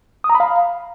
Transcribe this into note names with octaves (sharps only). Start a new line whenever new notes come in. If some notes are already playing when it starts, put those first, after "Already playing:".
D#6
A#5
B5
F5